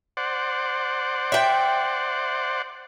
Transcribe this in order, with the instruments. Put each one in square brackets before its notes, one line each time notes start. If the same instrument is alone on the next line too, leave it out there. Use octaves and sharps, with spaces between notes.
[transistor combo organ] C5 D5 F#5
[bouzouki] E5 G5